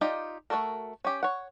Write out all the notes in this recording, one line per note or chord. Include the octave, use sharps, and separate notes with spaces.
D#4 F4 G4 D5 D#5
A3 A#3 F#4 A4 A#4
C#4 G4
C#5 F#5